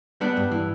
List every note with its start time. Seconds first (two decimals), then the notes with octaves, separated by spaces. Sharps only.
0.21 G3 B3 D4
0.37 G2
0.52 E3